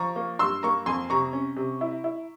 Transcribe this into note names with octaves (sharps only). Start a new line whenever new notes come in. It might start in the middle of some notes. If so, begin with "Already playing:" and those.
Already playing: F3 A#5 C#6
A#3
G2 C6 E6
A#3 A#5 C#6
F2 G#5 C6
C3 A#5 C#6
C#4
C3
E4
E4